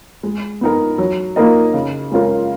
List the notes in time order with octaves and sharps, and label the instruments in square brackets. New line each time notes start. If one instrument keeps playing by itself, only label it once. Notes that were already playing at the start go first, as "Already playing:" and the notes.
[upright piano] G#3
B3 D#4 A#4
F#3
A#3 D#4 A#4 D#5
C#3
G#3 C#4 F4 A#4